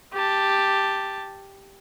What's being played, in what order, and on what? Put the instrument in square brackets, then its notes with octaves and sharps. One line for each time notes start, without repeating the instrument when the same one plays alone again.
[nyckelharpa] G4 A5